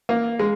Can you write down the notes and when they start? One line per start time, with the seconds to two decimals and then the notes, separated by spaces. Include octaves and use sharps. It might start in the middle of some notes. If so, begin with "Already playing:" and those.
0.09 A#3
0.40 G#3